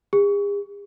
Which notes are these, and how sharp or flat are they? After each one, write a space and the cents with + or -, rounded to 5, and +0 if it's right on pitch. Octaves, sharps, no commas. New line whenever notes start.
G#4 -45